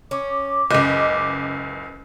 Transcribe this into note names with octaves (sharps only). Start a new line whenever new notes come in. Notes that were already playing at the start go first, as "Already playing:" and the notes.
C#4 D6
F#1 C#2 D#5